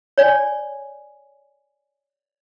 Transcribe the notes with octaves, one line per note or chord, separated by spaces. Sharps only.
C#5 D5 G#5